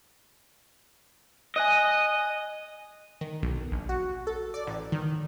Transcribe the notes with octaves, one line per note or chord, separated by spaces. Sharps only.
D#5 G#5 F#6 D#7
D#3
B1
A#1
F#4
A4
D5
A1
D#3